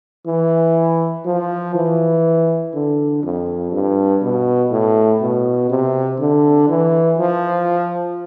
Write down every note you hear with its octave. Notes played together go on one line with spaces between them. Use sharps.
E3
F3
E3
D3
F2
G2
B2
A2
B2
C3
D3
E3
F3